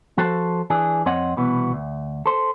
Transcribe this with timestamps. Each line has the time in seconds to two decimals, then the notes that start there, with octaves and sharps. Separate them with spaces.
0.18 F3 F#4 A4 C5 A5
0.70 E3 D4 G#4
1.06 F2 C4 C#5 D#5 F#5
1.37 C2 B2 E3 B3
1.73 D2
2.26 A4 C5